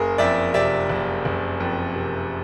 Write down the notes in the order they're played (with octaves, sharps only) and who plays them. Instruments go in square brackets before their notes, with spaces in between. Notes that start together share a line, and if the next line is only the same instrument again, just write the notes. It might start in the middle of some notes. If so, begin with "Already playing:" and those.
Already playing: [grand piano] F#1 G#4 A#4
F2 D5 E5
C3 D5 E5
F#1
F#1
F2
C3